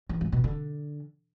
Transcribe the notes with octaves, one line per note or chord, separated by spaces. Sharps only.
E2
G#2
B2
D3